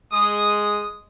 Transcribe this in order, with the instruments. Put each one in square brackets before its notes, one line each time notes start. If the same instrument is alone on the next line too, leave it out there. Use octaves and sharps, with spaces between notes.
[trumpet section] G#3 D#6